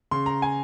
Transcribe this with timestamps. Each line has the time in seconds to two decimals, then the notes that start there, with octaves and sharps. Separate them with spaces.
0.11 C#3 C6
0.26 A#5
0.42 G#5